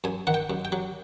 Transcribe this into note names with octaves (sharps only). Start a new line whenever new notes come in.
F#2 G#5
D#3 F#5
G5
F#2
G5
F#3